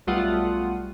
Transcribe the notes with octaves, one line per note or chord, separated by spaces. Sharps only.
B1 G3 A3 F4 F#5 D#6